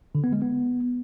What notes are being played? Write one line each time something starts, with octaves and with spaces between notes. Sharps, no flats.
D3
B3
G#3
B3